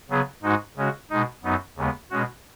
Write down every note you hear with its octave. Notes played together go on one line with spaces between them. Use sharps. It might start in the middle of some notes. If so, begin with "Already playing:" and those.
C#3 F#3 B3 G#4
G#2 G#3 D#4 F#4
C#3 G#3 C#4 F#4
B2 G#3 D#4
F#2 F#3 B3 D#4
D#2 C#3 G#3 B3
B2 G#3 C#4 F#4